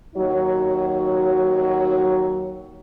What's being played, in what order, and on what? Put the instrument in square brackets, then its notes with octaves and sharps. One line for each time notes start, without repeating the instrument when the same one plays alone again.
[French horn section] D#2 F#3 D#4 F#4 C#5